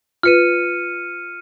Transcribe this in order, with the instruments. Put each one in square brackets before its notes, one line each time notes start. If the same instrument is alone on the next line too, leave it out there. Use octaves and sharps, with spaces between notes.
[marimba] F4 B4 [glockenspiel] F6 C#7 D#7